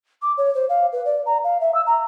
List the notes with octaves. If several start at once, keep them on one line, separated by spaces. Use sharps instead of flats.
D6
C#5
C5
F5
B4
D5
A#5
F5
E5
E6
A#5